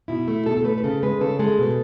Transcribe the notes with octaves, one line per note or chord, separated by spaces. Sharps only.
B2 E4
A3
B2 A4
A4
A3 B4
B4
C#3 A4
G#3 B4
C#3 A4
G#3 A4
B2